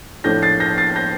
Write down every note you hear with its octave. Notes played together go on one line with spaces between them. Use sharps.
A2 F3 A3 D4 G6 A#6
A6 C7
G6 A#6
A6 C7
G6 A#6